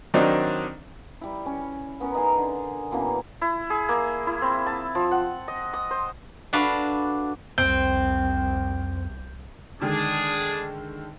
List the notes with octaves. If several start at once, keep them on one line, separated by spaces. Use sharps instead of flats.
D#3 F#3 C4 D4 D#4
G3 E4
C#4
B3 C#4 A#4
D#4 G#4 A#4 D#5
D3
B2 E3 A#3 C#4
E4
G#4
A#3
E4
C4
A5
F3
F#5
D#5
D#6
C5
D4 F#4 A4 B4 F5
C2 F2 C4 G6
D3 D#3 G#3 D4 G#4